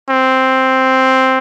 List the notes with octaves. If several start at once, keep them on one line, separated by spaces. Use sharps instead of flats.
C4